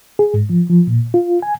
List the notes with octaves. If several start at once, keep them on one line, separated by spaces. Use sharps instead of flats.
G#4
G#2
F3
F3
A#2
F4
G#5